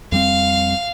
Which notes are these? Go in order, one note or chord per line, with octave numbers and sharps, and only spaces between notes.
F2 G3 C4 F5